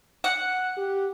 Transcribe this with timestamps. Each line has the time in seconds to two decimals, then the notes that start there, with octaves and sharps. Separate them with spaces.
0.24 F#5
0.77 G4